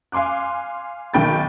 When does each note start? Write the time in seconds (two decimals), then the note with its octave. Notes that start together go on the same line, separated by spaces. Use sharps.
0.12 F5 G#5 C6 D6 F#6
1.14 B1 D#3 G5 B5 A6